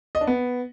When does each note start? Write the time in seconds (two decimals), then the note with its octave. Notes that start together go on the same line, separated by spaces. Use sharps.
0.15 D#5
0.21 D4
0.27 B3